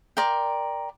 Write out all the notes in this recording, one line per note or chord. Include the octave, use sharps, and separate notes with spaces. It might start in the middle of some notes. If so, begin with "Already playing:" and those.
A#4 D5 G5 C6